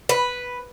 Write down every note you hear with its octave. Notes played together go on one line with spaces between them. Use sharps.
B4